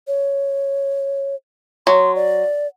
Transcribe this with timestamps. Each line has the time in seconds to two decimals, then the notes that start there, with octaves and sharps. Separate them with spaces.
0.07 C#5
1.87 F#3 C6
2.16 D5